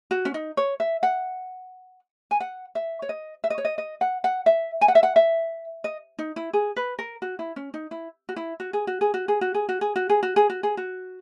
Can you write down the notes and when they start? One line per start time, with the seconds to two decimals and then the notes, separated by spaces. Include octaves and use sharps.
0.11 F#4
0.25 C#4
0.34 D#4
0.57 C#5
0.80 E5
1.03 F#5
2.31 G#5
2.40 F#5
2.75 E5
3.02 C#5
3.09 D#5
3.44 E5
3.50 D#5
3.58 C#5
3.65 D#5
3.78 D#5
4.01 F#5
4.24 F#5
4.46 E5
4.81 G#5
4.88 F#5
4.95 E5
5.03 F#5
5.16 E5
5.84 D#5
6.19 D#4
6.36 E4
6.53 G#4
6.76 B4
6.99 A#4
7.22 F#4
7.39 E4
7.56 C#4
7.74 D#4
7.91 E4
8.29 F#4
8.36 E4
8.60 F#4
8.73 G#4
8.87 F#4
9.01 G#4
9.14 F#4
9.28 G#4
9.41 F#4
9.54 G#4
9.69 F#4
9.81 G#4
9.96 F#4
10.09 G#4
10.23 F#4
10.36 G#4
10.50 F#4
10.63 G#4
10.77 F#4